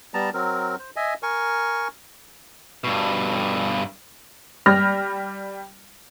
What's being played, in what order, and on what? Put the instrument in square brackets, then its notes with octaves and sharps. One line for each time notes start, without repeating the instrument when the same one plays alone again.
[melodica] G3 B3 A5 A#5
F#3 C4 A#4
C5
D#5 E5 G#5
A#4 G#5 C#6
[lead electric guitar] G2 B2
[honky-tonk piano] G3 G4 B5 F6 A#6